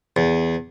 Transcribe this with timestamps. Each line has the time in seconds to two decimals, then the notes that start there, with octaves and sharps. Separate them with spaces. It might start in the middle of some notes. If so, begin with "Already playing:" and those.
0.16 E2